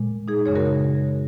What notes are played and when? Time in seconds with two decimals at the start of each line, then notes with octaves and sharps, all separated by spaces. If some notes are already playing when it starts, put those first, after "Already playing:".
Already playing: A#2 G#3
0.28 D#4 G#4
0.46 F#2 C#3 G#3 G#4 C#5
0.56 F#4 A#4